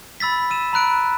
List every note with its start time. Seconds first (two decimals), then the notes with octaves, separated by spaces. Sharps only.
0.20 B5 E6 A6 B6
0.50 E6 D#7 E7
0.73 A#5 B5 F#6 D7